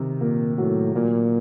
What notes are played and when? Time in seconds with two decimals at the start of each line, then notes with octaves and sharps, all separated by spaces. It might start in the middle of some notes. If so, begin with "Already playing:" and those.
Already playing: C3 D#3
0.20 A#2 A#3
0.57 A2 F#3
0.95 A#2 A#3